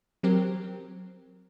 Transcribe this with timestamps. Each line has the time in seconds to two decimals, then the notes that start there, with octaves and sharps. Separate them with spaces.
0.23 F#3 C4 G4 A#4